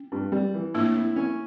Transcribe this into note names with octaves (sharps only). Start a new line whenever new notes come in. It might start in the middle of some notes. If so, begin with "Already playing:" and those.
Already playing: C#4
G2
G3
E3
A2 A#3 D4
E4
C#4